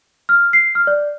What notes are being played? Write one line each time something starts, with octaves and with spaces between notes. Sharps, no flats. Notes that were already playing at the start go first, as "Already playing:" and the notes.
F6
C7
F6
D5